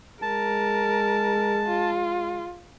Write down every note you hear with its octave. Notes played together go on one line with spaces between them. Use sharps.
G#3 A#4 A5
F4